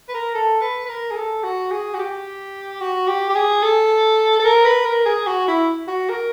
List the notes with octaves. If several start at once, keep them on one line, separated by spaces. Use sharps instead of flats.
B4
A#4
A4
B4
B4
A#4
G#4
A4
F#4
G#4
F#4
G4
F#4
G4
G4
G#4
A4
A4
A#4
B4
A#4
G#4
F#4
E4
F#4
A#4